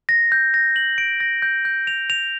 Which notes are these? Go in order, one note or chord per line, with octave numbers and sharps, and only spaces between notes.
A#6
G6
A#6
F#7
D7
A#6
G6
G6
F7
F7